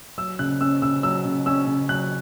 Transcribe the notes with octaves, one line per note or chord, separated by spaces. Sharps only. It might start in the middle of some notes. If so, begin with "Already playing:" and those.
F#3 E6
C#3 F#6
C#4 E6
C#3 E6
F#3 E6
C#3
C#4 E6
C#3
F#3 F#6